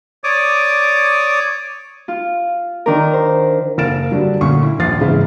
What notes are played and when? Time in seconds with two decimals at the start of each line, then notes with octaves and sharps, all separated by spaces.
0.24 C#5 D5 D6 D#6
2.08 F4
2.86 D#3 D4 A#4
3.13 C5
3.78 F#1 A#4 F5 A6 D7 E7
4.11 D3 F#3 G3 D4
4.41 D2 A#2 C#4 C6 C#6
4.63 E4
4.79 D#1 A#1 A6 C7
5.01 G#2 C#3 E3 E4